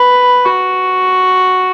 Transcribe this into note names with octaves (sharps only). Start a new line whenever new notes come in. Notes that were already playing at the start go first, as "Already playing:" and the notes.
Already playing: B4
F#4